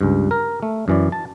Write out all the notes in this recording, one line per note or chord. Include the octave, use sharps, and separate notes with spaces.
C#2 G2
A#4
A3
F#2 E3 D5
A5